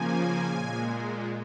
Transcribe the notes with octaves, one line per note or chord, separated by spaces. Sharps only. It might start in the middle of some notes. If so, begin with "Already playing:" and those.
Already playing: C#3 F3 A#3 G#5
A#2 G#3